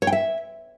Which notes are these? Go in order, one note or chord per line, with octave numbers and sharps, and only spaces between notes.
C#5
G5
E5